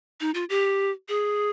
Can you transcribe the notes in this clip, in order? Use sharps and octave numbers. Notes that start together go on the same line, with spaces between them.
D#4
F4
G4
G#4